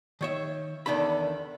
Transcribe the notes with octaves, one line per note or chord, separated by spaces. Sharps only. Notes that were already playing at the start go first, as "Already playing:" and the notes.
D#3 C#5 E5
E2 D#3 D4 A4 B5